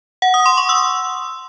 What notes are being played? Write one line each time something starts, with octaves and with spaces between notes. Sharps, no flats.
F#5
D#6
C6
C#6
E6